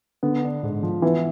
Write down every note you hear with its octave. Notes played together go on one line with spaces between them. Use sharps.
D3 B3
D4
G#2
F3
E3 B3